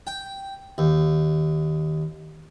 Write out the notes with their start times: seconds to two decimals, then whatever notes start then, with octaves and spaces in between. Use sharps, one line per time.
0.07 G5
0.78 D#2